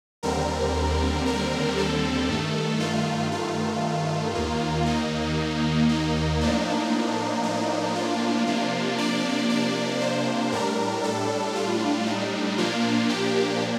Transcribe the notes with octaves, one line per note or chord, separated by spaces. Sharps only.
D#2 D3 G3 C4 A#4
A#4
A4
G2 D#3 A3
F4
F4
D#2 D#3 A#3
D#4
D#4
A2 F3 A#3 D4
D#4
F4
C3 F3 A#3 D4
D5
D5
C5
A2 G3 D4 A#4
A4
F4
D#4
A#2 F3 A#3 D4 F4
G4